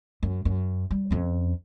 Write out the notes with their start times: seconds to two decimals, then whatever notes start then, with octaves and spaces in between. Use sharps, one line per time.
0.23 F#2
0.45 F#2
0.91 G3
1.11 F2 C#4